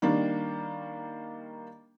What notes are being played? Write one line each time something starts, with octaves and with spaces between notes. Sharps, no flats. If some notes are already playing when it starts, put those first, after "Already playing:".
D#3 G3 A#3 D4